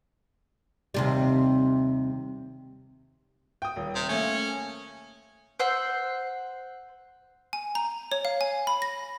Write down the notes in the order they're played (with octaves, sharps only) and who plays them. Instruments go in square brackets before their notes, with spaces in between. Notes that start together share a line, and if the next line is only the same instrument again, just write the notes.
[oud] D#2 C3 G3
[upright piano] G5 D#6
D#1
[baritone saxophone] C3
[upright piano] A3 A#3 [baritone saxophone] C#4
[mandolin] C5 F#5 E6
[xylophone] G#5
A#5
C#5
F5
G#5
B5
A#6